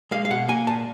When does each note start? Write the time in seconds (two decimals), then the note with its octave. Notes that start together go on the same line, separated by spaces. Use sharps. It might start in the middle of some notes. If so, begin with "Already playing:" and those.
0.11 G#3 F5
0.25 F5
0.31 B2 F#5
0.48 A#3 G#5
0.67 A#2 A5